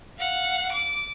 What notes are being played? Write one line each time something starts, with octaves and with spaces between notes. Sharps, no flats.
F5 F#5
D6